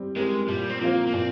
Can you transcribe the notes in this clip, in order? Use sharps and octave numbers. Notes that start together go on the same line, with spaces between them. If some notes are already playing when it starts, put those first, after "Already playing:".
Already playing: G3 C4 G4
G#3 C4 G4 A#4
A#2 G3
C4
F3 A#3 C4 F4 C5
A#3
A#2 C4